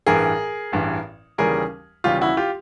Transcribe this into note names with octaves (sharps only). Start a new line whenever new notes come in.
A1 G2 E3 G#4 A#4
A1 G2 E3
D#2 C#3 E3 G3 G#4 A#4
D#2 C#3 E3 G3 F4 G4
E4 F#4
F4 G4